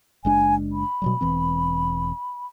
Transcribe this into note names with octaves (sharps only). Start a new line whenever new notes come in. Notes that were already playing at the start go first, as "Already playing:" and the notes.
F#1 G#3 D4 G#5
B5
B2 F#3 G3
E1 E3 C4